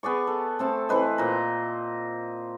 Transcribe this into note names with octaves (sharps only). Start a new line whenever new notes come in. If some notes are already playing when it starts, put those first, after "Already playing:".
B3 G#4 D5 C#6
A4
A3 C4 A5
E3 C4 B4 D#5
A#2 A#5